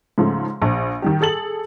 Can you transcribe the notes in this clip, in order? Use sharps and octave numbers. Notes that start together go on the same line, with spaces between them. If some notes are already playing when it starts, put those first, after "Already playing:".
G#2 C#3 F3 A3
A#1
D#3 G3 G4
G#4 A4 A6 F#7